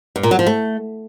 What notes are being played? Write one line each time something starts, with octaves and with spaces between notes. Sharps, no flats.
G2
A#2
F#3
F3
A3